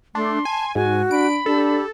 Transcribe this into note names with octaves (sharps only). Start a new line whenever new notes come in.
A3 D4 C6
G#5 A5
G#2 F#4 G#5
D4 B5 D7
D4 G4 A4